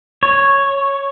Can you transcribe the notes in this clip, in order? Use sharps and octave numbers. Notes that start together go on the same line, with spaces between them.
C#5